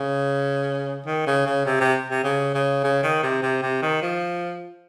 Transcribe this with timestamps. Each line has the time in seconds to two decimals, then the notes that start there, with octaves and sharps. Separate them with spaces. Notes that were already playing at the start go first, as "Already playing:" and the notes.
Already playing: C#3
1.06 D#3
1.27 C#3
1.46 C#3
1.66 C3
1.81 C3
2.10 C3
2.24 C#3
2.54 C#3
2.84 C#3
3.03 D#3
3.23 C3
3.42 C3
3.62 C3
3.82 D#3
4.02 F3